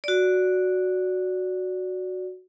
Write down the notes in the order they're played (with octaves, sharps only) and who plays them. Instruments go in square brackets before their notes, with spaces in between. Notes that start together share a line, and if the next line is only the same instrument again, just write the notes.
[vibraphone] F#4 D5